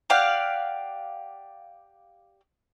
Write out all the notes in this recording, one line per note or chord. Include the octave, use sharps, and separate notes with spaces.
G4 D5 F5 F#5